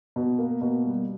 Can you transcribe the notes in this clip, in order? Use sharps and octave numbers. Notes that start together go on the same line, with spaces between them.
B2
A#3
B2
G3